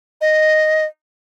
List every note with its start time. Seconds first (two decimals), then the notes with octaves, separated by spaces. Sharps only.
0.21 D#5